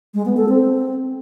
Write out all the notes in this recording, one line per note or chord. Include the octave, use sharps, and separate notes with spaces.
G#3
B3
A4
C4